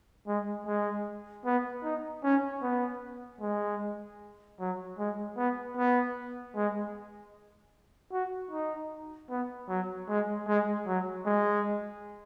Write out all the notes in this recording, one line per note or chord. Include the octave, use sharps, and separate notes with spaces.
G#3
G#3
B3
D#4
C#4
B3
G#3
F#3
G#3
B3
B3
G#3
F#4
D#4
B3
F#3
G#3
G#3
F#3
G#3